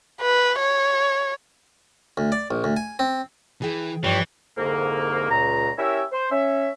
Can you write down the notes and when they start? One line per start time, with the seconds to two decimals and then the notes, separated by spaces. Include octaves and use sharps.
0.21 B4
0.60 C#5
2.17 D2
2.32 D5
2.51 A#1
2.64 D2
2.77 G#5
2.99 C4
3.62 E3 G#4 G5
4.04 G2 E3 F3 G4 C#5
4.57 C2 F2 G#2 D3 A#3
5.30 C#2 A#2 A#5
5.77 C#4 E4 G4 A#4 C#5 E5
6.12 C5
6.30 C#4 E5